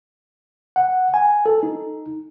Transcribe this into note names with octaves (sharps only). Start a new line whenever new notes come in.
F#5
G#5
A4
D#4